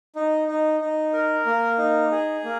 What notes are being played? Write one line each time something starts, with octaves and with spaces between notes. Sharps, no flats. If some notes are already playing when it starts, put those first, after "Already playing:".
D#4
D#4
D#4
A#4
A#3
D#4
G#4
A#3